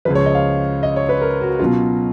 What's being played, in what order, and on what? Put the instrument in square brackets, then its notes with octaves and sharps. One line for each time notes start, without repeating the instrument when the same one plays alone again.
[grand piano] C#2 C#3 F3 B4
C#5
D#5
F5
D#5
C#5
B4
A#4
F#4
B2 F#3 C#4 F4